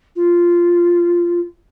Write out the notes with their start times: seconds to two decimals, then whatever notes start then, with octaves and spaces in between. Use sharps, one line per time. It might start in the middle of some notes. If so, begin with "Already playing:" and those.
0.16 F4